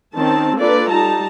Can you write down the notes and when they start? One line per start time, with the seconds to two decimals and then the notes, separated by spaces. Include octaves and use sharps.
0.15 D#3 C4 C#4 A5
0.57 A#3 D4 F4 A4 B4 D5
0.91 G3 D#4 A5 A#5